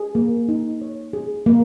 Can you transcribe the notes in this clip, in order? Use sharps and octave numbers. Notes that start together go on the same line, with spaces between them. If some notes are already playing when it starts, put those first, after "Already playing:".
Already playing: G#4
A#3
D#4
C#5
G#4
A#3